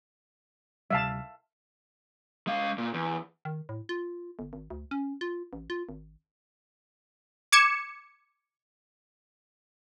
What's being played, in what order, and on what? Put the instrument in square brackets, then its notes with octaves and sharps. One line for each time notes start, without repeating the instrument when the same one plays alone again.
[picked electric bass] D2 C3 G3 [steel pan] E5 F5 A5
[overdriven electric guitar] G#3 F5
A#2
E2
[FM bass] D#3
A2
F4
G1
G#1
D2
C#4
F4
A1
F4
G#1
[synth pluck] D6 G#6 C#7 E7